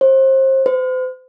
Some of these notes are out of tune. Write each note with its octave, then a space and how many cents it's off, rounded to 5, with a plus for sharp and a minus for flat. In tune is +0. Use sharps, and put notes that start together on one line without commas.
C5 +30
C5 -40